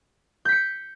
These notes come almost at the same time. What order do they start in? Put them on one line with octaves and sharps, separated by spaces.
G6 B6 C#7